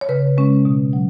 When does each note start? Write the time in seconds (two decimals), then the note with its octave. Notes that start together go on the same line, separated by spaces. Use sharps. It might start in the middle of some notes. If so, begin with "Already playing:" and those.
0.01 C#5
0.09 C#3 B4
0.38 G#3 C#4
0.65 B2
0.93 F#3